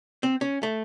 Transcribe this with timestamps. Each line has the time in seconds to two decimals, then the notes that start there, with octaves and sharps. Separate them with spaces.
0.23 C4
0.41 C#4
0.63 A3